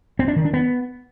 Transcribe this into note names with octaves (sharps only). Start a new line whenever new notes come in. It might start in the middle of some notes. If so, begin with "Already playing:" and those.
C4
D4
D#3
D4
B3